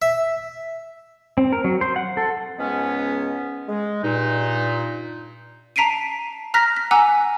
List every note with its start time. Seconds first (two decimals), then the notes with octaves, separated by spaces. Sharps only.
0.02 E5
1.38 C4
1.52 A#4
1.64 F#3
1.81 C5
1.96 F#5
2.17 A4
2.59 C#2 G#2 G#3 B3 C#4
3.68 G#3
4.03 G2 A#2 D#4
5.76 A5 A#5 B6 C7 D7 D#7
6.54 A#5 F6 F#6 A#6 B6
6.77 B6
6.91 F#5 G#5 A#5 D6 E6 F#6